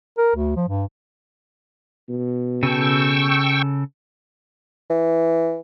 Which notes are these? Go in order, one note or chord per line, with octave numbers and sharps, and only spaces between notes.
A#4
D2
F3
G2
B2
C#3 A4 G5 C#6 E6
E3